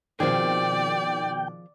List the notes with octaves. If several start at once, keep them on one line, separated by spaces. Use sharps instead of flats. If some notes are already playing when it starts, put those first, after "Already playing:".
B2 D#3 F3 C4 G#4 D5 G5